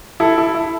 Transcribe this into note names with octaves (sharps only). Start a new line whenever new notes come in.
E4 A4
E4 A4
E4